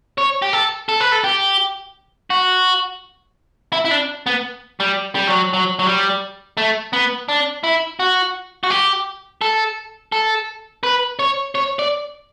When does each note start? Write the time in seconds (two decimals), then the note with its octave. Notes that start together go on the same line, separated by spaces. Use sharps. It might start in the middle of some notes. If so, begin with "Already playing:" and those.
0.18 C#5
0.42 G4
0.53 A4
0.89 A4
1.00 B4
1.12 A4
1.24 G4
2.30 F#4
3.73 E4
3.85 E4
3.91 D4
4.26 B3
4.80 G3
5.15 G3
5.27 F#3
5.53 F#3
5.79 F#3
5.86 G3
6.57 A3
6.93 B3
7.29 D4
7.64 E4
7.99 F#4
8.64 F#4
8.70 G4
9.41 A4
10.12 A4
10.83 B4
11.19 C#5
11.55 C#5
11.79 D5